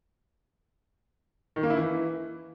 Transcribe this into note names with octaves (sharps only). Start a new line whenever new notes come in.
D#3
A#3
E4
E3